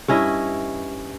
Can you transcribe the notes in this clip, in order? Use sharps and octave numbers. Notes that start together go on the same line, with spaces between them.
G2 C#4 E4 D#5